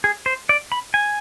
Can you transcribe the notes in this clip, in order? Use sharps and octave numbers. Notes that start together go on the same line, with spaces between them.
G#4
C5
D5
B5
G#5